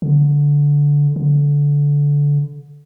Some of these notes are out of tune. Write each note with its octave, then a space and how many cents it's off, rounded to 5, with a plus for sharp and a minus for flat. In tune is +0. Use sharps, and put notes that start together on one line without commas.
D3 -15
D3 -20